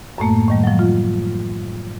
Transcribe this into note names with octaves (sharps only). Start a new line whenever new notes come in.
F#2 A2 A3 A#3
A2 D#3 G3
F3 F#3
F4